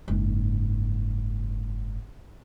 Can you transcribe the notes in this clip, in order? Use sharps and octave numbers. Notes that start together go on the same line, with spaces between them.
F#1 G#2